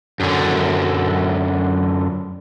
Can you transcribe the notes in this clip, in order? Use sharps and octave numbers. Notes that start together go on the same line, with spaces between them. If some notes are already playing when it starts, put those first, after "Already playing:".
F#2 D3